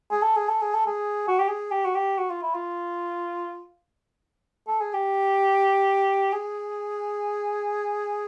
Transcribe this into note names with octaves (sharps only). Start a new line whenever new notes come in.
G#4
A4
G#4
A4
G#4
A4
G#4
F#4
G4
G#4
G4
F#4
G4
F#4
F4
E4
F4
A4
G#4
G4
G#4